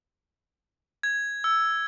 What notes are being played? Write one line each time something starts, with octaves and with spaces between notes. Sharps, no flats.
G#6
E6